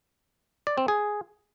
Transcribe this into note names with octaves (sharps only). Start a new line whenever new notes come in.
D5
C4
G#4